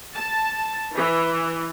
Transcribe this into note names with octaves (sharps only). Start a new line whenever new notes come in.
A5
E3